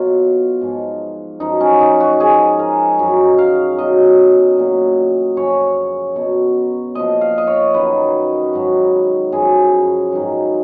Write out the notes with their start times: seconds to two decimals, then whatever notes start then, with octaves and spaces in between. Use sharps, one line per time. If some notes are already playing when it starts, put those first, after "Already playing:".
Already playing: B2 F#3 F4
0.61 G#2 F3
1.40 F#2 F3 D#4
1.60 C#4
1.81 D#4
2.00 F#4
2.19 G#2 F3 G#4
2.59 A#4
2.99 F#2 D#3 F#3
3.38 F5
3.78 B2 F#3 D#5
4.58 A#2 F#3
5.37 F#2 C#3 F3 C#5
6.16 B2 F#3
6.95 A#2 F3 D#5
7.21 F5
7.38 D#5
7.47 C#5
7.74 F#2 D#3 F#3 B4
8.53 G#2 D#3 F#3
9.32 F#2 C#3 F3 G#4
10.12 G#2 D#3 F#3